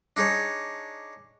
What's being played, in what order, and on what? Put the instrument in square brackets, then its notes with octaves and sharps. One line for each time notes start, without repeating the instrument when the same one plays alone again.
[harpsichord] D4 D#4 G#4 C#5